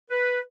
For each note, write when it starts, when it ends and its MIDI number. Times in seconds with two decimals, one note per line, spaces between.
0.10 0.39 71